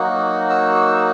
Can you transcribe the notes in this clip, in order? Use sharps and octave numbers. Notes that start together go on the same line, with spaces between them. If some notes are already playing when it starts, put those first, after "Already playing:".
Already playing: F#3 A#3 D#4 F#4
E6
E6